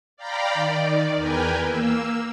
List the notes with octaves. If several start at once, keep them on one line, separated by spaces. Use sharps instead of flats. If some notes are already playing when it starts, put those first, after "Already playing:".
D5 F5 G5 A#5 B5
D#3 D5
E2 A#4 B4 G5 G#5
A#3 E6